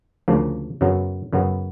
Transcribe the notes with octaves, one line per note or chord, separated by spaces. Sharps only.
D2 C#3 F3 A#3
F#2 C#3 F#3 B3
F#2 C#3 F#3 B3